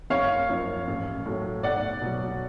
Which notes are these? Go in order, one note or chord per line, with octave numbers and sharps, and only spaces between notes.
F#1 C#5 F5
F#2 F3
A1
A2 F#3
B1 D5 F#5
B2 F#3